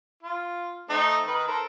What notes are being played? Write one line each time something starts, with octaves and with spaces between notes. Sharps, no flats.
F4
A3 C4 D#4
D#3 D#4 B4
A4 A#4 C5